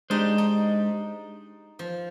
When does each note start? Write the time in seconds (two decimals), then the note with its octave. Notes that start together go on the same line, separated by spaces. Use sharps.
0.10 G#3 D4 D#4 G4 C5
0.38 D#4
1.79 F3